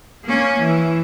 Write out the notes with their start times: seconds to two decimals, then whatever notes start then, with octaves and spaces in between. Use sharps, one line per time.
0.24 A#3 C#4
0.58 E3